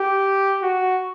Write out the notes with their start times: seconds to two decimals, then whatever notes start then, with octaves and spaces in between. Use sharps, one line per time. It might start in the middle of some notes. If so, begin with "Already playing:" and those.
Already playing: G4
0.62 F#4